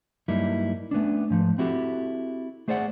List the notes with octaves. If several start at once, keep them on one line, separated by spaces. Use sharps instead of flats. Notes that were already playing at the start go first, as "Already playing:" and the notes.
G2 F#3 G3 A#3 D#4 E4
A3 B3 C#4 D4
G#2 F3 A3
C4 E4 F#4 G4 A4
A3 G#4 C5 D5 E5 F#5